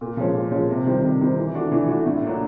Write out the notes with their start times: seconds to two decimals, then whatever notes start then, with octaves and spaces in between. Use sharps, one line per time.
0.01 A#2
0.17 F3 G#3 C#4
0.35 A#2
0.51 F3 G#3 C#4
0.69 C3
0.86 D#3 G3 C4
1.03 C3
1.21 D#3 G3 C4
1.37 E3
1.54 A3 D4 F#4
1.72 E3
1.88 A3 D4 F#4
2.06 A2
2.22 F#3 A#3 D4